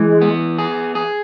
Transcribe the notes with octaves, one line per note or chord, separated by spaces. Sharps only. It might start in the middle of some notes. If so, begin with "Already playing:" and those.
Already playing: E3 G#3
B3
G#4
G#4